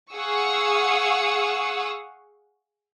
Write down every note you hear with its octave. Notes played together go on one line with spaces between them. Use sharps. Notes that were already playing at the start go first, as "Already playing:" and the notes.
G#4 F5 F#5 C#6 D#6 E6